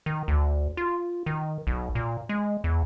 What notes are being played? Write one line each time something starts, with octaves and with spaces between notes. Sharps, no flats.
D#3
D2
F4
D#3
B1
A#2
G#3
E2